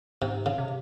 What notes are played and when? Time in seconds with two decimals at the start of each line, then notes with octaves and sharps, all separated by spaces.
0.22 G#2 C3
0.46 C#3
0.58 C3